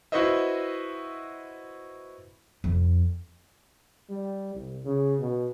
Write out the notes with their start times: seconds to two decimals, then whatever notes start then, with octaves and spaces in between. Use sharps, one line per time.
0.12 E4 F#4 B4 C5 D#5 E5
2.64 F2
4.09 G3
4.55 C2
4.85 C#3
5.19 B2